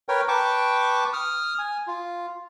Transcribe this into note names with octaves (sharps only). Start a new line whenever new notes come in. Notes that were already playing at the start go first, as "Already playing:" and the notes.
A#4 B4 C#5 G5
B4 G5 A5 C#6 D6
D#6 F6
G#5
F4